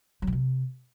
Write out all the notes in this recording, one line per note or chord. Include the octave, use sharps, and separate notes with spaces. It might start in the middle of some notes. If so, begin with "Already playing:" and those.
F#3
A#2
C3